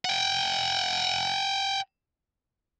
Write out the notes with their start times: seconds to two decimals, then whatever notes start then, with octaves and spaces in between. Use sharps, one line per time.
0.05 F#5 G5